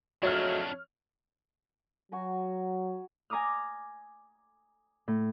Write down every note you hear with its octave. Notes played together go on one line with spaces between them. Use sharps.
F2 F#3 G#3 A3 D4 C#5 F6
F#3 F#4 G#5 A#5
G#5 A#5 D6 D#6 F6
A2